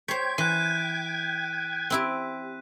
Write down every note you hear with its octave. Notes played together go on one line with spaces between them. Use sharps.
C5 C#5 G5 G#6 B6
E3 F#6 B6 D#7
C4 E4 G4